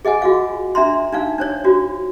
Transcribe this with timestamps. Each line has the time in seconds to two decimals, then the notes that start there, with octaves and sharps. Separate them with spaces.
0.05 G#4 D#5 F#5 G#5
0.22 F4 F#4 G#4 F5
0.75 D4 E5 A#5 C6
1.13 D4 D#4 F5
1.38 D4 C5 C#5
1.64 D4 F4 F#4